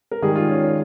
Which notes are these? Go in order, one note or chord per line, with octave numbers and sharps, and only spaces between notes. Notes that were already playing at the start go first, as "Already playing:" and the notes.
A#4
G#2 D#3 G3 G#4
F4
C#4
C#4